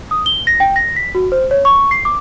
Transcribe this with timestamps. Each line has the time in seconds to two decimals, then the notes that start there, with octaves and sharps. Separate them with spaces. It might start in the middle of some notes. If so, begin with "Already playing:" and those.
0.11 D#6
0.26 G7
0.47 A#6
0.60 G5
0.76 A#6
0.96 B6
1.15 F#4
1.32 C5
1.51 C#5
1.65 C#6
1.91 C7
2.05 D6